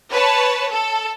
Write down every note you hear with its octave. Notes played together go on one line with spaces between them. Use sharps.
B4 C#5 A5
A4